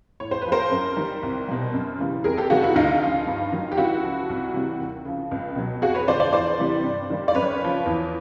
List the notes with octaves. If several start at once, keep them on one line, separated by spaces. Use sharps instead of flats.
A2 C#5
C5
F3 B4
A#4 C5
F#2
D#3 G3
C2
B2 G3
F#2
C#3 E3 G3
F2 G#4 A#4
G4 A4
C3 D#3 G3 F#4 G#4
E4 F#4
D2 D#4 F4
C#3 F3
G2
D#3 F#3
G4
C#2 E4 F#4
C#3 F3
C2
C3 E3 G3
D#2
C#3 F3
C#2
B2 F#3
F2 F#4 G#4
B4 C#5
D3 F3 C5 D5
C5 D5
E2 C5 D5
C3 E3 G3
G2
D#3 G3
D5
F#2 B4 C#5
C#3 F3
E2